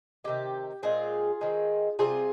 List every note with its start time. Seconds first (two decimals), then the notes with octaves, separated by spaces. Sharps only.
0.24 C3 D#3 G#3 G4
0.83 A#2 G#3 C4 F4 G#4
1.41 D#3 G#3 C4 D#4
1.99 C3 G3 C4 F4 G#4